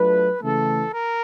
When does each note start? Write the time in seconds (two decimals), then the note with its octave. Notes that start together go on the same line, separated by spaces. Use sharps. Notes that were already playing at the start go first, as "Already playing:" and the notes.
Already playing: F#3 A3 D4 F4 B4
0.41 C#3 E3 A3 A4
0.94 A#4